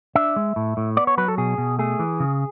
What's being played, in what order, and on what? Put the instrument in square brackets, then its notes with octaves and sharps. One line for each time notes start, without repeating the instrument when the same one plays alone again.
[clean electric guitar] D4 E5
G#3
A2
A2
B3 D5
C#5
F#3 B4
A4
B2 G#4
B2
A3 G#4
E3
C#3